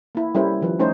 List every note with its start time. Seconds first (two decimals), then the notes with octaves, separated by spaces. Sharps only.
0.15 A#3 E4
0.35 G3 C#4 E4 A#4 C5
0.61 D#3 F3 B4
0.79 A3 C#4 D#4 C5